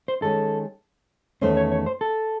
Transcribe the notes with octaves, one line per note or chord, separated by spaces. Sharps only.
C5
D#3 G#3 C#4 G#4 A4
E2 D#3 A3 C#4 C5
C#5
C#5
C5
A4